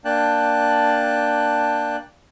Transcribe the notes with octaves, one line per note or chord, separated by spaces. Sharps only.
A#3 D4 G5 A5 F#6